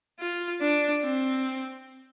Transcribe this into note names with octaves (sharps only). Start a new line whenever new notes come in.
F4
D4
C4